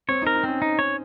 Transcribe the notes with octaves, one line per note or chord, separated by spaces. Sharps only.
C4 C#5
D#4
A#4
D#4
C4 C#4
D#4
C#5